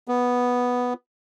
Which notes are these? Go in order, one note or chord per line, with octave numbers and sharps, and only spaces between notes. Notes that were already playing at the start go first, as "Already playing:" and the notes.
B3